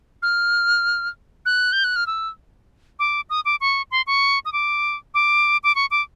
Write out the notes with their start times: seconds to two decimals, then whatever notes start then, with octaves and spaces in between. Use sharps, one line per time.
0.22 F6
1.46 F#6
1.73 G6
1.84 F#6
1.96 F6
2.07 E6
2.99 D6
3.30 D#6
3.45 D6
3.61 C#6
3.91 C6
4.07 C#6
4.45 D#6
4.53 D6
5.14 D6
5.63 D6
5.75 C#6
5.91 D6